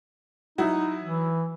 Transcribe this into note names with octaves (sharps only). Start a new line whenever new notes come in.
F#3 D#4 E4 F#4
E3